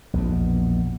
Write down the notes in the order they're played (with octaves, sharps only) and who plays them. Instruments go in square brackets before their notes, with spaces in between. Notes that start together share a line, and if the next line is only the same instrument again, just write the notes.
[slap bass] A#1 E2 B2